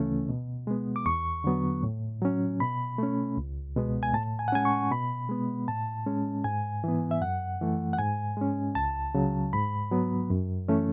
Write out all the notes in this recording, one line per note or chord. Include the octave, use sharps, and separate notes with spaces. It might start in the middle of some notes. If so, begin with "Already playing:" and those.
Already playing: D2 C#3 E3 A3 C#4
B2
G#3 B3
D6
E2 C#6
D3 F#3 B3
A2
F#3 C#4
B2 B5
A3 C#4
C#2
B2 G#3 B3
G#5
A2 A5
G#5
F#5
G#3 C#4 G#5
C#6
B2 B5
G#3 B3
A2 A5
G#3 C#4
G#2 G#5
E3 B3
E5
F#2 F#5
E3 A3
F#5
G#2 G#5
G#3 C#4
C#2 A5
C#3 F#3
G#2 B5
F#3 B3
F#2
E3 A3 C#4